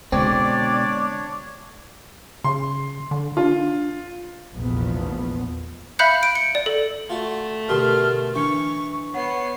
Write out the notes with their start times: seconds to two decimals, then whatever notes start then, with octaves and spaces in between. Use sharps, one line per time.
0.12 B2 D3 G#3 C4 D4 C#5 D5
2.44 C#3 C6
3.11 D3
3.37 D4 F4
4.54 F1 A#1 E2 F3 B3
5.99 E5 F5 B5 F#6 G6 C#7
6.23 D7
6.35 C#7
6.55 D5
6.66 A4
7.10 A3 F4 F#4
7.69 D2 B2 G4 A#4 A5 C6 F6
8.35 E3 D4 C#6 C#7
9.14 B3 C#5 F#5 C7